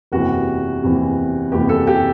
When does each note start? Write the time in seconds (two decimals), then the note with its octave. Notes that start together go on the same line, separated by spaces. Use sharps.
0.12 F#1 E2 C3 E3 F#4
0.83 F#1 E2 C3 E3
1.52 F#1 E2 C3 E3 G4
1.69 A4
1.87 G4